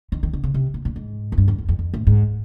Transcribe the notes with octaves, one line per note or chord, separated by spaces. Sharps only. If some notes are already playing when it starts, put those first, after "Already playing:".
D#3
D#3
D3
C#3
C3
A#2
A#2
G#2
F#2
G2
F#2
F2
F2
F2
A2
G#2